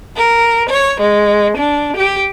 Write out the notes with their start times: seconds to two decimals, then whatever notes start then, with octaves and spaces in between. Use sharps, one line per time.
0.16 A#4
0.68 C#5
1.00 G#3
1.56 D4
1.96 G4